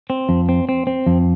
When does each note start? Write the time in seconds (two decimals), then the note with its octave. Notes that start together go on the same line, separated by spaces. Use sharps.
0.10 C4
0.29 F2
0.49 C4
0.69 C4
0.87 C4
1.07 F2